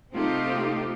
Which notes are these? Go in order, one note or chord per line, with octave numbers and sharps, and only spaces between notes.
C3 A3 C4 D#4 F4 G4